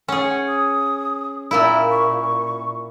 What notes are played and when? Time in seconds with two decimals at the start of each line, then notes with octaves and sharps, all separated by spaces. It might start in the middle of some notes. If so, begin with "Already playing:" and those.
0.08 C#4 G#4 F#5
0.48 D#6
1.51 A#2 A#3 E4 E5
1.90 C#6